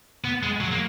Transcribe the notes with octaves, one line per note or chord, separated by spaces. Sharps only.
B3
G#3
F#3
A#3